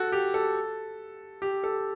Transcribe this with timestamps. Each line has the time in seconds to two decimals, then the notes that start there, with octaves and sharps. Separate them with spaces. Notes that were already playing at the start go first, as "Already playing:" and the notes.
Already playing: F#4 A4
0.12 G4
0.34 A4
1.42 G4
1.64 A4